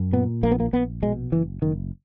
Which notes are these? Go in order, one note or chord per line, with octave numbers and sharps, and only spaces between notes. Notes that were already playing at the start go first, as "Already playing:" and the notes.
Already playing: F#2
A#2 B3
A#1 A#3
B3
A#3
A#1 B3
B2 G#3
F#1 E3
F#1 D#3